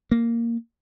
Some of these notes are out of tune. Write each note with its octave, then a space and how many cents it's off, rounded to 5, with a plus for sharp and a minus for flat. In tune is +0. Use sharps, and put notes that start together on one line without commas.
A#3 -5